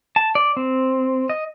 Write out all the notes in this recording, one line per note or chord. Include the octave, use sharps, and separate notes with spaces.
A5
D5
C4
D#5